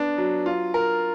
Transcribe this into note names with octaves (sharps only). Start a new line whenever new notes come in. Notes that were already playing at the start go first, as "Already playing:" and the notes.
Already playing: B3 D4
F#3
F4
A#4